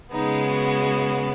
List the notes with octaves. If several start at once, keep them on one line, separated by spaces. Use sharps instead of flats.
C#3 G#3 B3 D#4
F#4